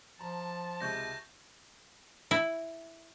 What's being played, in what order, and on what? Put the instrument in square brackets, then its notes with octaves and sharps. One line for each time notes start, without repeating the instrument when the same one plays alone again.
[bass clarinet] F3 [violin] A5 [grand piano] A#5
[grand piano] C#2 C3 G#3 [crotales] C#6 G6 A#6
[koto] E4